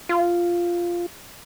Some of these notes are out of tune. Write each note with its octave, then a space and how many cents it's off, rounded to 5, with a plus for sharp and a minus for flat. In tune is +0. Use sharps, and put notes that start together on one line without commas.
F4 -5